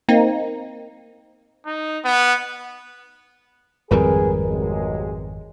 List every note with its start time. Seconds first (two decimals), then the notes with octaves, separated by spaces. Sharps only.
0.08 A#3 C4 D#4
1.66 D#4
2.04 B3
3.91 G#1 F2 G3 G#4 A#4 B4
4.41 B1 C3 G#3